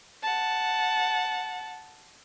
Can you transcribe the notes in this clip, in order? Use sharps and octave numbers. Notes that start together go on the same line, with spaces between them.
F#5 A5